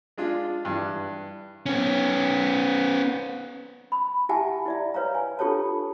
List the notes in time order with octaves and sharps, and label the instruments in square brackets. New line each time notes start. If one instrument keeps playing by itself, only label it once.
[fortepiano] G#3 D4 F4
G2 E3
[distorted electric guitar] B3 C#4
[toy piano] B5
E4 G4 E5 F#5 G#5 A5
E4 D5 E5
B4 C#5 F5 A#5
G#5
D4 F4 G4 A4 C#5 A5